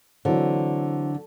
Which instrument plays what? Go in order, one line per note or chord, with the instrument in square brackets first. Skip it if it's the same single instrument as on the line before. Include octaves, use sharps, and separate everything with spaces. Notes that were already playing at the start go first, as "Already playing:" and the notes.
[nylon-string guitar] D3 [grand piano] E3 F#3 C4